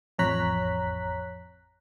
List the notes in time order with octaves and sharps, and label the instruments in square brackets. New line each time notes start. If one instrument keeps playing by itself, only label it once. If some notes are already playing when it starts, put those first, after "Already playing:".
[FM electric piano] A1 F2 C#5 A#5 F#6 B6